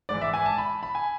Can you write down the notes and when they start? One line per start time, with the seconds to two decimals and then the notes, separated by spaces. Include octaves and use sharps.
0.09 G#2 E3 D5
0.21 E5
0.34 G#5
0.46 A5
0.58 B5
0.83 B5
0.95 G#5